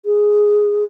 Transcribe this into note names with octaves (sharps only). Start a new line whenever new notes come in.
G#4